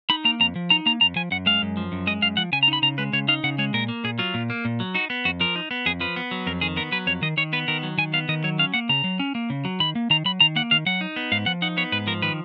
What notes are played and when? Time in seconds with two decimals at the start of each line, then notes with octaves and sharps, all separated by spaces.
0.10 D#4 B5
0.25 A#3 A#5
0.40 F2 A#5
0.56 F3
0.70 D#4 A#5
0.86 A#3 A#5
1.01 F2 A#5
1.16 F3 G#5
1.31 F#2 F#5
1.46 G#3 F5
1.62 F#2
1.77 F3
1.92 F#2
2.07 G#3 D#5
2.22 F#2 F5
2.37 F3 F#5
2.52 C#3 G#5
2.63 A#5
2.68 D#4
2.73 B5
2.82 C#3 A#5
2.98 G#3 B4
3.13 C#3 C#5
3.28 D#4 F5
3.44 C#3 F#5
3.58 G#3 C#5
3.74 A#2 A#4
3.88 A#3
4.04 A#2 G#4
4.19 F#3 F4
4.34 A#2
4.50 A#3
4.65 A#2
4.80 F#3
4.95 D#4 F#4
5.10 B3
5.25 F2 F#4
5.40 F3 A#4
5.56 D#4
5.71 B3
5.86 F2 G#4
6.00 F3 B4
6.16 B3
6.31 F#3
6.47 F2 A#4
6.61 D#3 G#4
6.77 B3 A#4
6.92 F#3 B4
7.07 F2 C#5
7.22 D#3 D#5
7.37 D#3 C#5
7.53 B3 B4
7.68 D#3 A#4
7.83 F#3
7.98 D#3 G#5
8.13 B3 F5
8.29 D#3 D#5
8.44 F#3 C#5
8.59 C#4 F5
8.74 A#3 F#5
8.89 C#3 A#5
9.04 F#3
9.19 C#4
9.35 A#3
9.50 C#3
9.65 F#3
9.80 D#3 B5
9.95 A#3
10.10 D#3 A#5
10.25 F#3 B5
10.40 D#3 A#5
10.56 A#3 F#5
10.71 D#3 F5
10.86 F#3 F#5
11.01 D#4
11.16 B3
11.32 G#2 F5
11.46 F3 F#5
11.62 D#4 F#5
11.77 B3 C#5
11.92 G#2 B4
12.07 F3 A#4
12.22 D#3 B4